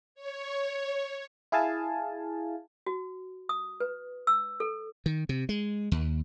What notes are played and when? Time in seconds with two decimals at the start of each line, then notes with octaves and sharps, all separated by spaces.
0.15 C#5
1.52 E4 G#4 F5 G#5 A5
2.86 F#4
3.49 D#6
3.80 B4
4.27 E6
4.60 A4
5.06 D#3
5.29 C3
5.49 G#3
5.92 D#2